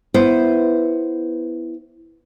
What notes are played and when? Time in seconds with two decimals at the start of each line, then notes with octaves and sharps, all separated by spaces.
0.14 B3 E4 C5